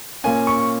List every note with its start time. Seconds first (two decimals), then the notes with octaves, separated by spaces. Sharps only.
0.24 A#2 A#3 C#4 G#5
0.47 C#6